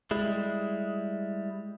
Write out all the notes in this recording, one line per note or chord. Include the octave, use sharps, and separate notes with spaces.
G3 G#3 E4